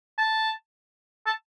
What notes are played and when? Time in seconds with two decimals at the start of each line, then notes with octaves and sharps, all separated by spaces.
0.18 A5
1.26 A5